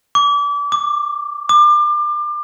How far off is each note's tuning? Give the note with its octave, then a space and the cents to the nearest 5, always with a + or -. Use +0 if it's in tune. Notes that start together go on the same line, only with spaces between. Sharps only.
D6 -30
D6 +15
D6 +30